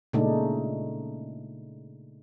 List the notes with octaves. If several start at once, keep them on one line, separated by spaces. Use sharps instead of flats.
A#2 C#3 G#3 A3 D4 D#4